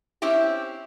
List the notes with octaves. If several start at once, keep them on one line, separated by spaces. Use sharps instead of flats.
C4 C#4 E4 G4